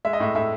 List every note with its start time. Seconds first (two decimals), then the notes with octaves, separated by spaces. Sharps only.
0.05 G#3 E5
0.13 D#5
0.20 A2 E5
0.35 A2 E5